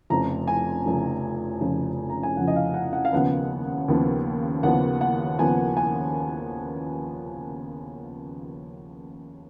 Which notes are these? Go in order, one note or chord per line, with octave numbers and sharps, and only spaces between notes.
F1 F2 C#3 F3 A#5
G#5
F1 F2 C#3 F3
F1 F2 C#3 F3
A#5
G#5
F1 F2 C#3 F3 F#5
D#5
F5
F#5
F#5
F5
D#2 C#3 F3 B3 F#5
D#2 C#3 F3 B3
D#2 C#3 F3 B3 F#5
F#5
D#2 C#3 F3 B3 G#5
G#5